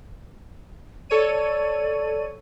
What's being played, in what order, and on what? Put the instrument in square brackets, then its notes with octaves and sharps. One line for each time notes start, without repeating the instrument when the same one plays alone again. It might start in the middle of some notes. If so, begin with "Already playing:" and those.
[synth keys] A4 C#5 D#7 [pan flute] D5